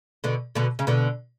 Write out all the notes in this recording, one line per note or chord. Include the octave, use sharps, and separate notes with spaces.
B2 D3
B2 D3
C#3
B2 D3